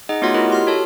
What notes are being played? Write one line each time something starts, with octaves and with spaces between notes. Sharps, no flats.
D#4 G#4 D#5 F#5
A3 B3 F4 F#4 C#5 F#5
E4 F4 A#4 D#5
G4 C6 F6
F#4 A4 C#5 A5